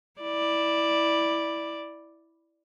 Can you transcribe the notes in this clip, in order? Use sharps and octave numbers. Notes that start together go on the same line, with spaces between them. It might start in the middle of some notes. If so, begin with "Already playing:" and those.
E4 D5